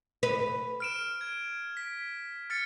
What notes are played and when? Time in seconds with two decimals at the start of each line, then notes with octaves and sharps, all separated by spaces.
0.23 B4
0.80 F6 D7 E7
1.21 G#6
1.77 B6
2.50 F6 A6 C#7